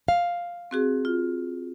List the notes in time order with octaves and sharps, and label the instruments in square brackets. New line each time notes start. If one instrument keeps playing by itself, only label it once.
[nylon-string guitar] F5
[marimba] C4 F#4 G#4
F4